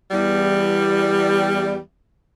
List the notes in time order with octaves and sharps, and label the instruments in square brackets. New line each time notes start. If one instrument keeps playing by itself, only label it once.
[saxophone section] E2 G3